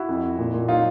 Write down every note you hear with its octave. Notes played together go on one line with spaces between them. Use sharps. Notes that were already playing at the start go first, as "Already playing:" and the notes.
Already playing: E4 F#4
F2
F2
A#2
A#2
F#3 D#4 F4